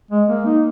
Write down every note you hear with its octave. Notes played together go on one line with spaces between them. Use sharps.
G#3
A#3
D#4